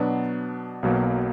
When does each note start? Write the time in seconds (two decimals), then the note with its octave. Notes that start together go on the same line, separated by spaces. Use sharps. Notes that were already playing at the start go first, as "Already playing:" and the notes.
Already playing: B2 F#3 B3 D4
0.83 B1 B2 F#3 A#3